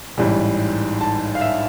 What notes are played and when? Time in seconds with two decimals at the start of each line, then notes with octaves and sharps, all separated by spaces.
0.18 A1 G#2 E3 G3
1.01 A5
1.35 F5
1.41 E5